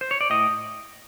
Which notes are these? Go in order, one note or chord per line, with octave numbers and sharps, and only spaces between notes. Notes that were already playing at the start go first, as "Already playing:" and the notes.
C5
C#5
D5
A2 D#5